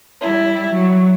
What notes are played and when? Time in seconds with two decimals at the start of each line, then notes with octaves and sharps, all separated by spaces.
0.21 G3 E4
0.73 F#3